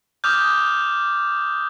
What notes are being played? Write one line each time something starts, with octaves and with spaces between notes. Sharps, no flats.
D6 D#6 F6 G6